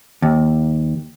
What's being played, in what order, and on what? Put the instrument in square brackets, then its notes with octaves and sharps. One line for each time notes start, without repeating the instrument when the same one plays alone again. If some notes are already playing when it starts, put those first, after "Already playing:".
[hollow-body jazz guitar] D#2